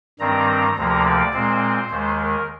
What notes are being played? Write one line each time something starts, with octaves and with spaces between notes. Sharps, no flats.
G2 D#3 G3 C4 A#5
D2 C3 F3 A#3 A#5
D5
A#2 G#3 C4 C5
D#2 D#3 G#3
A#4